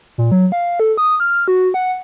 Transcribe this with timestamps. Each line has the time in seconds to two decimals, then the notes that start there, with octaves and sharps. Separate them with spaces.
0.18 A#2
0.32 F#3
0.52 F5
0.80 A4
0.97 D#6
1.20 F6
1.48 F#4
1.74 F#5